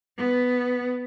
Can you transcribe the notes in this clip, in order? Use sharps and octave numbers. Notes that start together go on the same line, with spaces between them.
B3